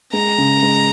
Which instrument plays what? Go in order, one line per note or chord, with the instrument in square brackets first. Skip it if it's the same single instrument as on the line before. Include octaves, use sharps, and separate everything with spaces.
[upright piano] G#3 [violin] A#5
[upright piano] C#3
G#3